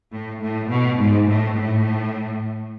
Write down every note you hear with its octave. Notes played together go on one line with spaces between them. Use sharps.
A2
A2
B2
G#2
A2
A2